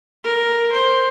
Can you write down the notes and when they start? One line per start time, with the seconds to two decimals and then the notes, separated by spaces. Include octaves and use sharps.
0.24 A#4
0.72 C5